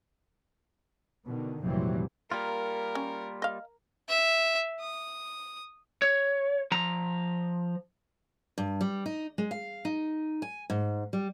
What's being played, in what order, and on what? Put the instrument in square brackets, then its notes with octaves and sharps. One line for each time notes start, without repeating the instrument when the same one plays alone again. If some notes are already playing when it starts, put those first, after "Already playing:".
[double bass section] B2 D3 D#3
F1 A#2 E3 F#3 G3 C4
[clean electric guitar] G3 A#3 F4 [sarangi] A#4
[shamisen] C#4
D#5 F5
[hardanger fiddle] E5
D#6
[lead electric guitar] C#5
F3 A#5
[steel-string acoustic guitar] G2
G3
D#4
G#3
F5
D#4
G#5
G#2
G3